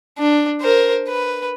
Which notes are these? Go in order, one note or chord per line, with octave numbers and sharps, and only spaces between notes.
D4
A#4 C5
B4